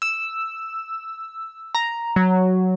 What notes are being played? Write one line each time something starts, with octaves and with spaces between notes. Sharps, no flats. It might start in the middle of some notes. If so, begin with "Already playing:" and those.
E6
A#5
F#3